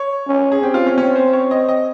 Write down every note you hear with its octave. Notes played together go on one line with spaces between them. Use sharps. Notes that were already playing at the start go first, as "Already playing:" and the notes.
Already playing: C#5
C#4
G#4
C4 G4
F4
C#4
C#4
C5
C#5
D#5
D#5